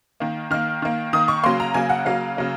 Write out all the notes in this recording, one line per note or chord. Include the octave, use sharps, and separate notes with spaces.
D#3 A#3
D#3 A#3 F6
D#3 A#3
D#3 A#3 D#6
C#6
C#3 F#3 A#3 C6
A#5
C#3 F#3 A#3 G#5
F#5
C#3 F#3 A#3 F5
C#3 F#3 A#3